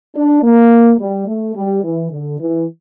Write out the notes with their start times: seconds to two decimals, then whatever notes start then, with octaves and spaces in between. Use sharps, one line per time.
0.16 D4
0.43 A#3
0.99 G3
1.27 A3
1.56 G3
1.84 E3
2.11 D3
2.40 E3